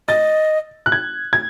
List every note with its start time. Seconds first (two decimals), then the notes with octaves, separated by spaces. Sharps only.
0.08 D#5 A6
0.86 F#6
0.92 G#6
1.33 G#6